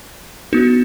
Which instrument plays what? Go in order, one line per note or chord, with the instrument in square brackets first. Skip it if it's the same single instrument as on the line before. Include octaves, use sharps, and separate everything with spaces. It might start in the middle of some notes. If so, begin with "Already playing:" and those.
[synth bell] B3 D#4 F#4